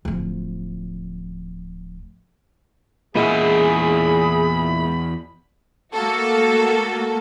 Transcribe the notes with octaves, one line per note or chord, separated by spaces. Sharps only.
D1 F3
E2 A#2 G#3 E4 G#4 D#5 F#5 B5
A3 A#3 F#4 A4